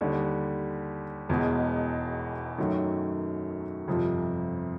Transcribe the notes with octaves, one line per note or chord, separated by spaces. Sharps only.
D#2 D3 G3
E1 E2 B2 G#3
F#2 D#3 F#3 A3
G1 F2 C3 F3